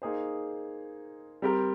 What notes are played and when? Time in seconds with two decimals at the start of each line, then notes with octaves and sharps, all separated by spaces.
0.02 A#3 D#4 G#4 C5
1.42 G3 C4 G4 A#4